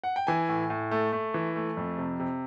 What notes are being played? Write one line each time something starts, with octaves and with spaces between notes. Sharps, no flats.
F#5
G5
E3 G#5
A2
A2
A3
A3
E3
A3
F2
C3
C3